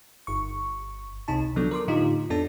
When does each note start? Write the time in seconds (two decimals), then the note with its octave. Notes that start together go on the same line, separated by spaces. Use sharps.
0.27 G1 C#6
1.28 C2 C3 D#4 A5
1.56 D3 F3 F#3 B3 D4 A4
1.71 A#4 C6 D6
1.88 A2 D3 D#4 F4 G4
2.30 F2 B3 D4 A4 A5